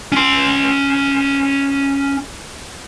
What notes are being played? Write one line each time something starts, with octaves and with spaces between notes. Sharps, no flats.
C#4 C6